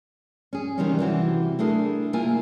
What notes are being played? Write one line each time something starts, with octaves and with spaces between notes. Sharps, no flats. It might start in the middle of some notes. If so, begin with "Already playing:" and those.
C#4 G#4
C3 D#3 E3 G3 C4 C#4
C3 E3 E4 F#4
A3 D4 E4 G#4 A#4
C3 A#3 E4 F4 G#5